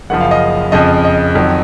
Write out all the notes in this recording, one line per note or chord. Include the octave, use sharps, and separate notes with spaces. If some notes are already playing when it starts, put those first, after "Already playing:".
F#1 F#2 C#3 F3 F#5
F5
D#5
F2 C#3 F3 D#5
D#5
F2 D#3 F#3